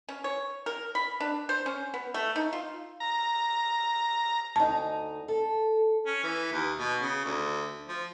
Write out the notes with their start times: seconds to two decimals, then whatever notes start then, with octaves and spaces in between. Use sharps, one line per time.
0.09 C#4
0.24 C#5
0.66 A#4
0.95 B5
1.20 D4
1.49 C5
1.66 C#4
1.94 B3
2.14 A3
2.36 D#4
2.53 F4
3.00 A#5
4.56 D2 D#4 A5
5.28 A4
6.07 C#4
6.23 E3
6.52 D#2
6.79 B2
7.02 C#3
7.25 D2
7.89 F3